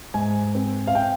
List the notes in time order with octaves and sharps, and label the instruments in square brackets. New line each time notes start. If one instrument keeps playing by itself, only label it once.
[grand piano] G#2 G#5
C4
F5
G5